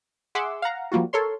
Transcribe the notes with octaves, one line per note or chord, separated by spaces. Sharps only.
G#4 E5 F#5 C6 D6 E6
F5 F#5 A#5
F3 G3 A#3 F4 F#4
A4 A#4 C#5 C6